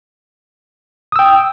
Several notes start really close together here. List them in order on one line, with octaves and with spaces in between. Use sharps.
D#6 E6 G5